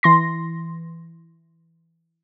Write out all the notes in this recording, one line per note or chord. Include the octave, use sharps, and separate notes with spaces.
E3 C6 A#6